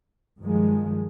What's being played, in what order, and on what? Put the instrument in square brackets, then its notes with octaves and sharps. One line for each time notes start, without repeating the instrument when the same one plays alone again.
[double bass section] G2 D#3 F3 G#3